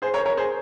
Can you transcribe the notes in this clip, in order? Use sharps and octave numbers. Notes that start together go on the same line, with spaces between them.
G#4 C5
A#4 C#5
A#4 C#5
G#4 C5